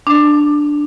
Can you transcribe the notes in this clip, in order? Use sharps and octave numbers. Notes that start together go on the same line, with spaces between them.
D4